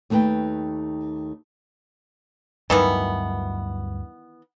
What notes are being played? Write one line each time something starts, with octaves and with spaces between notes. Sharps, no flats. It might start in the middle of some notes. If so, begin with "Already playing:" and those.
D#2 A3 D#4 B4 G5
D2 G2 D#3 E3 F#3 B3